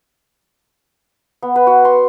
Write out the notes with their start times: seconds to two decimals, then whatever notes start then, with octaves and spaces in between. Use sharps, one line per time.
1.42 B3
1.56 B4
1.67 F#4
1.85 C6